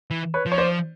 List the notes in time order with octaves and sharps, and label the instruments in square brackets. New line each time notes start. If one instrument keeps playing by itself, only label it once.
[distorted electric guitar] E3
[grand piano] B4 C#5
[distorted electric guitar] F3
[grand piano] C#5
C5 D5